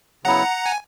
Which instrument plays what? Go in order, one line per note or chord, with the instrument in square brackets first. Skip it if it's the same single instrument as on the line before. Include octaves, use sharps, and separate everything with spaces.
[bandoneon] C#3 F#3 B3 E4 [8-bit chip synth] F#5 A#5
[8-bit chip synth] G#5